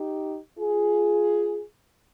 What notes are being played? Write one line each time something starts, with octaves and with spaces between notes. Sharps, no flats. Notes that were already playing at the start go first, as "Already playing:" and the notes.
Already playing: D#4 G4
F4 G#4